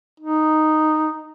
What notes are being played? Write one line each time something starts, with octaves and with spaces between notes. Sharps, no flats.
D#4